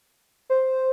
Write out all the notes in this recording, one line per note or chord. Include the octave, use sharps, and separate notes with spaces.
C5